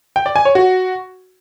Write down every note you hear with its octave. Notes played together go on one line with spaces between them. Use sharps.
G5
D5
G#5
C#5
F#4